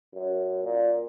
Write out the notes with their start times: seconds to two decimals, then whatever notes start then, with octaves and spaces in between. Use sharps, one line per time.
0.14 F#2
0.63 A#2